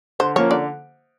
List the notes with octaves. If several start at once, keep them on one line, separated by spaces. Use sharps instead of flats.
D3 C5
F3 A#3 C#4 C#5
D3 D5